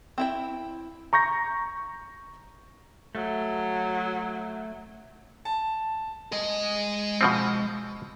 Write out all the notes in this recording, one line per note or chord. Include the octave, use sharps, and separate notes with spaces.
C4 E4 G5
A#5 C#6 G6 A#6
F#3 A3
A5
G#3 D#5
B2 F3 C4